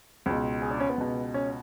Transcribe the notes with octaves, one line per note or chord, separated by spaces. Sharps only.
C#2 B2
G#4
D4
C#4
B3
C#2 B2
C#4